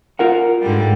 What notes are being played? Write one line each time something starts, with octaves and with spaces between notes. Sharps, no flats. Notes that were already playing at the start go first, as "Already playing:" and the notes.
F4 A#4 F#5
G#2 D3 G3